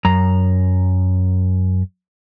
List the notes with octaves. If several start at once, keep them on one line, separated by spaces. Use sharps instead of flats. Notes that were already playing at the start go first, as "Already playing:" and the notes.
F#2 A#5